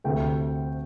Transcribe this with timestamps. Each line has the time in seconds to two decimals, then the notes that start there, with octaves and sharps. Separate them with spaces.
0.04 D2 C3 A3 G5